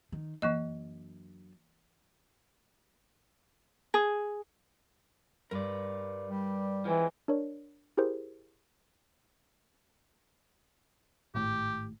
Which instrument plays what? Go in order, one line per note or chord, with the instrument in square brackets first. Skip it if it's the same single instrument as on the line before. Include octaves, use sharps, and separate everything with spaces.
[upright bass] D#3
[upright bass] F#2 D4 [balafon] E3 A#3 D#5
[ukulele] G#4
[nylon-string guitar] G2 [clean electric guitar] A#4 B4 D5
[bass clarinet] G3
[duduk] E3 [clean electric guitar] F3 G#3 C4
[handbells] D4 A#4 C#5 D5
E4 G4 G#4 A#4 C5
[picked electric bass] G#1 A2 [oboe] G4